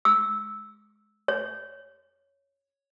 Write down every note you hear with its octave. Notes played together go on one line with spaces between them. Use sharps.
E6
C#5